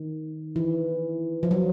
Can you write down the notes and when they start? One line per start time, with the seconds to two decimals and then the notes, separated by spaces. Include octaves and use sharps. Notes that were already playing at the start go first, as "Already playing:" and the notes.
Already playing: D#3
0.56 E3
1.43 F3
1.51 F#3